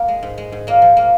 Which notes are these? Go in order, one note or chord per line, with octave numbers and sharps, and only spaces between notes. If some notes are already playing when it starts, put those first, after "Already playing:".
Already playing: A#3
G#3
G#2
G#3
G#2
A#2 A#3
F3
A#3